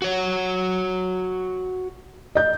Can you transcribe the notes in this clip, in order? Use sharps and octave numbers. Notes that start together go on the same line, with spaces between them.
F#4 C#5
D#5 G6